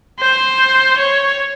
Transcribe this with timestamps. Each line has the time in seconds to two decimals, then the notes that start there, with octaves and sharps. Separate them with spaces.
0.19 C5
0.99 C#5